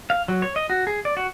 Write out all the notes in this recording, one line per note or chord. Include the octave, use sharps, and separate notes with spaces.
F5
F#3
C#5
D#5
F#4
G#4
D5
F#4